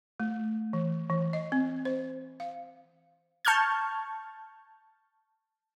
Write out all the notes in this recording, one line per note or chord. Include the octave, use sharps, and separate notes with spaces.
A3
E3
E3
D#5
C4
C5
F5
A5 C#6 F6 G6 G#6